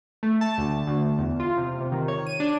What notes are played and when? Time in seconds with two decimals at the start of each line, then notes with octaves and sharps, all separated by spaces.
0.23 A3
0.41 A5
0.58 D2
0.87 D2
1.19 E2
1.40 F4
1.57 C3
1.80 C3
1.92 D#3
2.08 C#5
2.27 D#7
2.40 D4